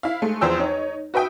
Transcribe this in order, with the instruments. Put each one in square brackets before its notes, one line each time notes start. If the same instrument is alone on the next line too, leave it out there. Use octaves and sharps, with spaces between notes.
[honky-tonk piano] E4 F5
G#3 A3
E2 F3 C5 G5 E6
D#4 C#5
F#4 B4 E5 G5 D#6